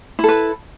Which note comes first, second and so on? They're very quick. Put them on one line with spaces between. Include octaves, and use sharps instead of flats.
E4 A4 B4